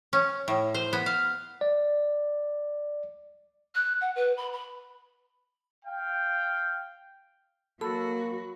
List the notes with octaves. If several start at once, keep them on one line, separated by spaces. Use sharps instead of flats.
C#4
A2
C5
B3
F5
D5
F#6
F#5
B4
B5
B5
F5 G5
F#3 A#3 F#4 A4 B5